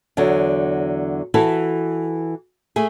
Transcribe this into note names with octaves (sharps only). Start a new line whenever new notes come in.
E2 D3 F#3
E3 E4 F#4 A4
A3 G#4